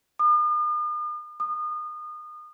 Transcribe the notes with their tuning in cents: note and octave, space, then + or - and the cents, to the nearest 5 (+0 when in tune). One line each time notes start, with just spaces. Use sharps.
D#6 -45
D#6 -30